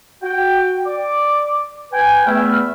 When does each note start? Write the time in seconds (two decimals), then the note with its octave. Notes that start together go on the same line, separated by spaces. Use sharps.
0.23 F#4 G5
0.86 D5 D6
1.92 B4 G5 G#5
2.26 E2 A3 B3 E5 B5 F6